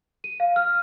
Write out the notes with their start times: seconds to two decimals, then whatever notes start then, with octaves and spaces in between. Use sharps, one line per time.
0.24 D#7
0.40 F5
0.56 F6